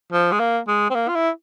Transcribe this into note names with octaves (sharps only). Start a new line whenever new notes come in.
F3
G#3
A#3
G#3
C4
A#3
F4
E4